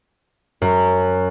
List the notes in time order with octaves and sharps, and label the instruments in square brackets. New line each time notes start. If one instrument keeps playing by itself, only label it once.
[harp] F#2